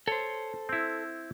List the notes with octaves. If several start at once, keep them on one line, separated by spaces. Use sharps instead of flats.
A4 C5 C#5
C4 E4